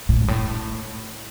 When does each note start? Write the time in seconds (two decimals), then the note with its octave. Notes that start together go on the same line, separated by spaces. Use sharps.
0.09 A2
0.21 G2
0.28 A2